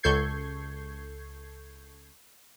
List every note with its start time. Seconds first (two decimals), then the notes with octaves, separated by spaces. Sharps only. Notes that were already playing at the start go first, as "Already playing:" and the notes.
0.03 C#2 A4 C#6 G6 G#6 C7